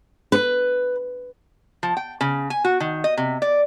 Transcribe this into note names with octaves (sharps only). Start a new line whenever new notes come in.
B4
F3
G5
C#3
G#5
F#4
D#3
D#5
C3
D5